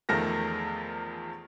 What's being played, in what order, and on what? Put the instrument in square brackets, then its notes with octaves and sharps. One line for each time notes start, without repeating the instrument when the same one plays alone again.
[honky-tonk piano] E2 D#3 F3 A3 A#4 A#6